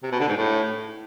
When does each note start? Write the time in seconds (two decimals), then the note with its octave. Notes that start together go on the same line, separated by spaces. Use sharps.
0.03 C3
0.11 B2
0.20 D3
0.28 G#2
0.37 A2